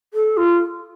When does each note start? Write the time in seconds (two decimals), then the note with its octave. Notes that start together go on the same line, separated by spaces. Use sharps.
0.14 A4
0.37 F4